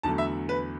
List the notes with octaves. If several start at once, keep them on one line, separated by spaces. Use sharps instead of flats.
E2 D3 F#3 A3 A5
E5
B4